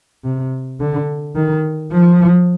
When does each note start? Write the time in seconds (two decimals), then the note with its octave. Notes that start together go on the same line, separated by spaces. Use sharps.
0.24 C3
0.80 D3
1.36 D#3
1.92 F3